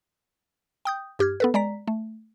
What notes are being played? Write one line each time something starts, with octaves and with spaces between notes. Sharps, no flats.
G5 D#6 G6
G2 G4 F6 G#6
B3 A4 B4
G#3 D5 A#5 B6
A3